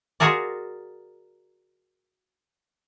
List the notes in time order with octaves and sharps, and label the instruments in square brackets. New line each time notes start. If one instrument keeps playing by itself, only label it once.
[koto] F4 F#4 G#4 A#4 D5